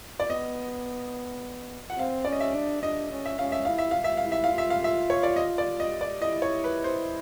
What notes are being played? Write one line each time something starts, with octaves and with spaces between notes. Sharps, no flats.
D5
B3 D#5
F#5
C4 F5
C#4 D5
D#5
E5
D4
D4 D#5
C#4
E5
C#4 F5
E5
E4 F5
E5
F5
E5
F5
E4
E5
F5
F4
E5
F5
E5
C#5
D5
D#5
D5
D#5
D5
E4 D#5
C#5
B4
C5